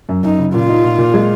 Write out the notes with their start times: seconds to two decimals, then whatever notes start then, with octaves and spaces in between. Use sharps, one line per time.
0.09 F#2
0.23 F#2 D#4
0.39 C#3
0.54 A#2 F4
0.69 D#4
0.84 A#2
0.98 A#2
1.14 G#3